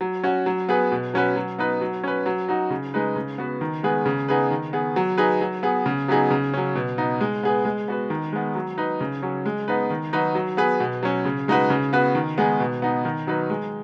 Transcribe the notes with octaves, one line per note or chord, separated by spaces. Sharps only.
F#3
C#4 F#4
F#3
B3 G#4 B4
B2
F#3 C#4 F#4 B4
F#3
B3 D#4 B4
F#3
C#4 B4
F#3
D#4 F#4
C#3
G#3 D#4 B4
C#3
B3 F#4 B4
D#3
G#3 B3 G#4 B4
C#3
B3 D#4 G#4 B4
D#3
B3 G#4
F#3
D#4 G#4 B4
F#3
B3 G#4
C#3
F#3 B3 D#4 G#4
C#3
F#3 C#4
B2
B3 D#4
G#3
B3 G#4 B4
G#3
B3 F#4 B4
D#3
G#3 B3
F#3
D#4 B4
C#3
F#3 C#4
G#3
B3 D#4 B4
D#3
F#3 D#4 F#4 B4
F#3
B3 G#4 B4
B2
F#3 C#4
C#3
G#3 D#4 F#4 B4
C#3
B3 F#4 B4
D#3
G#3 B3 D#4 G#4
B2
B3 D#4
D#3
F#3 D#4 B4
G#3